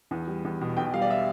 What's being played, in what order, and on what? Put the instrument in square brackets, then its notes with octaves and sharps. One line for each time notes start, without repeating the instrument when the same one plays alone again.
[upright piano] E2
G3
E2
B2
B1 G5
G3 F5
D5
E5